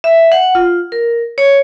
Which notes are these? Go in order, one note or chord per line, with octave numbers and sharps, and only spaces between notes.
E5
F#5
F4
A#4
C#5